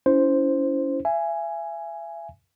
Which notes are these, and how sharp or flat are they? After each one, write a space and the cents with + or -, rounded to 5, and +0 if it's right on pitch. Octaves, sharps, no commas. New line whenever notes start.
C#4 +25 E4 +0 C5 +0
E5 +35 G#5 +0